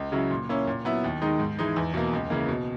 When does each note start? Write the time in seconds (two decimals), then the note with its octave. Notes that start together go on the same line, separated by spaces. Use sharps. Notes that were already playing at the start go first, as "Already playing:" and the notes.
Already playing: C#2
0.12 C#3 F#3 C#4 E4
0.31 A#2
0.49 A#3 C#4 E4
0.67 A#2
0.85 F#3 B3 E4
1.04 D#2
1.22 D#3 G#3 D#4
1.40 G#2
1.59 E3 G#3 D#4
1.76 E2
1.94 B2 A#3
2.13 C#2
2.30 C#3 E3 A#3
2.48 B2